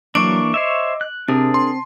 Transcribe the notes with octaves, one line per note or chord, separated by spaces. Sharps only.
E3 F#3 A#3 D4 C#6 D6 D7
C5 C#5 D#5 E5
F#6
C3 C4 D4 G#4 A#4 A5
C6